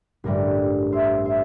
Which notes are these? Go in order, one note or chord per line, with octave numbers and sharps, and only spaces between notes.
A1 G2 D3 G3 A#4 D5
C5 E5
C5 E5